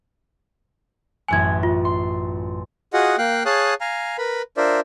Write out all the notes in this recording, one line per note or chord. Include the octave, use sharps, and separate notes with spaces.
A1 F#2 G#5 F#6 G#6
F4
C6
F4 F#4 G#4 D#5 F#5
A#3 F5 G5 F#6
G#4 C#5 F5 A5 D#6 F#6
F5 G#5 A#5
A#4 B4 B5
D4 F4 A#4 C5 D5 E5